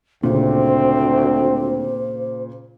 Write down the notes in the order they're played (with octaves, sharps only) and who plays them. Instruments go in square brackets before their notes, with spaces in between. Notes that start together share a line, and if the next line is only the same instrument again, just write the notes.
[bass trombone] D2 [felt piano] A#2 C#3 [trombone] C4 [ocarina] C5